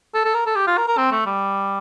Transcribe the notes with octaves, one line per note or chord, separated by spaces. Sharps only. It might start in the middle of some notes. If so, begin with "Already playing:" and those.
A4
A4
A#4
A4
G4
F4
A#4
A#4
C4
A3
G3